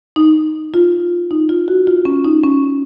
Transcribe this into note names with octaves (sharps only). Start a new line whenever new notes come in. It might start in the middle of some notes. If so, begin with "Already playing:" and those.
D#4
F4
D#4
F4
F#4
F4
C#4
D#4
C#4